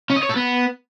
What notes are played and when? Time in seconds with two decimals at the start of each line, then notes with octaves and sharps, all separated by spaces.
0.10 C#4
0.16 D#5
0.23 C#5
0.29 A4
0.36 B3